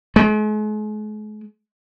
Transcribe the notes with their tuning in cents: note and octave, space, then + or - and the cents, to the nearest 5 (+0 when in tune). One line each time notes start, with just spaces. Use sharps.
G#3 +40